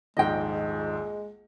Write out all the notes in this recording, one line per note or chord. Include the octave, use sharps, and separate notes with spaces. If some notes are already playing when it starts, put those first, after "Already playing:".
D#1 A#1 G#2 G#3 D#5 G5